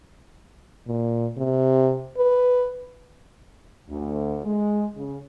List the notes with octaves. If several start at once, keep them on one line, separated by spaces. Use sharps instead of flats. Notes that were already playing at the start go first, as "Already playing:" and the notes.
A#2
C3
B4
D2
G#3
C#3